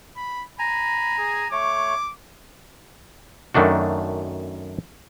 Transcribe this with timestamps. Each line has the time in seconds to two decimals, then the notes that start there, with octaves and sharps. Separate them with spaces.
0.17 B5
0.59 G#5 A#5 B5
1.18 G#4
1.52 A3 C#5 D6
3.54 F#2 D#3 A3 D4 F#4